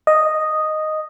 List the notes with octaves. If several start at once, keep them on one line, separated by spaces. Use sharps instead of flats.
D#5